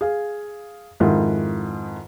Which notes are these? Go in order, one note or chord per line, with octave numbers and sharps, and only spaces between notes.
G#4 F5
F2 G#2 D#3 E4 F4